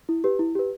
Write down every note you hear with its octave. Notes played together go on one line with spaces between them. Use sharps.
E4
G4 B4
E4
G4 B4